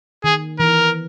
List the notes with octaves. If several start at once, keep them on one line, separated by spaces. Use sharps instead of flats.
D#3 G#4
E3 A#4